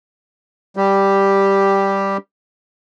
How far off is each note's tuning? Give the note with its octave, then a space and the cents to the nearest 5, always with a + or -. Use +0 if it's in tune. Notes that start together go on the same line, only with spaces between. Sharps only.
G3 +0 G4 +0